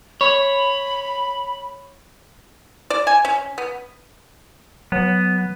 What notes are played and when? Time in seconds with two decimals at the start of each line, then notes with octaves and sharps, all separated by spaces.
0.21 C#5 B5
2.90 D5
3.07 G#5
3.25 C#4
3.58 B3
4.92 F#3 B3